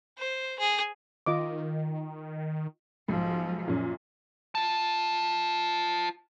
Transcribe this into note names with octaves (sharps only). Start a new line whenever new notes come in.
C5
G#4
D#3 F4 D#5 D6
B1 G#2 F3
F#2 A#2 C#4
F4 A5